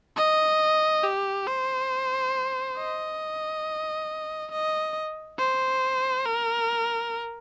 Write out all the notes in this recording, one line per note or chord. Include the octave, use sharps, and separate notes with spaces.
D#5
G4
C5
D#5
D#5
C5
A#4